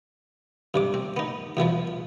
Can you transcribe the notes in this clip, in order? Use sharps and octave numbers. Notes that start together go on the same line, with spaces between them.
G2 C3 D6
C4
B3 D#4
E2 B2 E3 F3